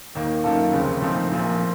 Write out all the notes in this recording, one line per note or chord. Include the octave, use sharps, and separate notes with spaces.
D#2 D#3 A#3
F#2 D#3 A#3 F4 A4
F1 D#2 C#3 A3 C4
A#2 F3 A3 C4 D#4
A#1 A#2 F3 C4
A3 C4